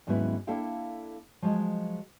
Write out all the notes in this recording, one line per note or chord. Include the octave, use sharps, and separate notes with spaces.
D#2 G#2 F#3 B3 C#4 E4
A#3 D4 E4 A4 F5 G5
F3 F#3 G#3